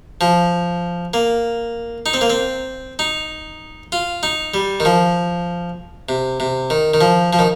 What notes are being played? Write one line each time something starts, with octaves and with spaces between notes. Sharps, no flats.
F3
A#3
D#4
C4
A#3
C4
D#4
F4
D#4
G3
D#3
F3
C3
C3
D#3
D#3
F3
F3
D#3